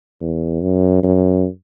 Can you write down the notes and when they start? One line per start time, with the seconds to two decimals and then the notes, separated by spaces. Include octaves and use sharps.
0.21 E2
0.62 F#2
1.03 F#2